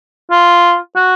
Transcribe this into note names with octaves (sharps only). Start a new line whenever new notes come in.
F4
F#4